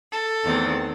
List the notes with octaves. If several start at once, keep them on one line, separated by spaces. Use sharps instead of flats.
A4
E2 D#3 A3 C4 D#4